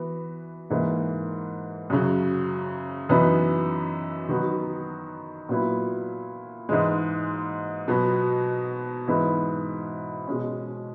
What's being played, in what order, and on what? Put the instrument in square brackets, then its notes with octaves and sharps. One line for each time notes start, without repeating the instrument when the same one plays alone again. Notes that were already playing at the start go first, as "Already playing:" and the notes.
Already playing: [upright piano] E3 B3 F#4
G#2 E3 A#3
F#2 C#3 F#3
F#2 E3 B3 D#4
D#3 F#3 B3 F#4
A#2 F#3 B3 E4
G#2 E3 G#3
B2 F#3 B3
G#2 E3 B3 E4
B2 G#3 C#4